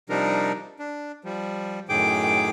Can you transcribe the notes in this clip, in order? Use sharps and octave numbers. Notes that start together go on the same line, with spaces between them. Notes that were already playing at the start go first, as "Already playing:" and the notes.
C3 F3 G3 D4 D#4 A#4
D4
F3 G3
F#2 A2 D#3 G#4 G5 D6